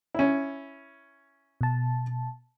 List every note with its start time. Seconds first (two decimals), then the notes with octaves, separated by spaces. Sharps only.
0.15 C#4 E4
1.61 B2 A5